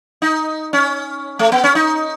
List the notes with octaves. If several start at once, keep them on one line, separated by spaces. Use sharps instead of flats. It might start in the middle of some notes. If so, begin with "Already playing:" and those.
D#4
C#4
A3
B3
C#4
D#4